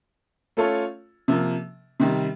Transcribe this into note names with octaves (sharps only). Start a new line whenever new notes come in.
A3 C#4 F4 A4 C#5
C3 F3 A#3
C3 D#3 G3